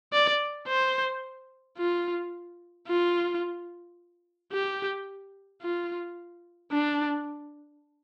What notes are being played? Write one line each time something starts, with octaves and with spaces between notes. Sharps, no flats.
D5
C5
F4
F4
G4
F4
D4